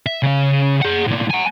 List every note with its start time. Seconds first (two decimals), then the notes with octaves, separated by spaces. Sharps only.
0.06 E5
0.22 C#3 C#4
0.82 G#4 F#5
1.07 A2 A#3
1.31 F#5 G#5